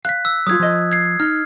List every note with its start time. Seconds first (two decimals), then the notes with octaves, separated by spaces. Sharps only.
0.05 F5 F#6 B6
0.25 E6
0.47 F#3 G3 F4 D#6 G#6
0.60 F3 D#5
0.92 G#6 C7
1.20 D#4 F6